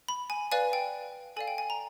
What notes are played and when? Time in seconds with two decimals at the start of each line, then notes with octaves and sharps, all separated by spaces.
0.08 B5
0.30 G#5
0.52 B4 D5 F5 G#5
0.73 G5
1.36 A4 D5 F5 G#5
1.48 G5
1.58 G#5
1.70 A#5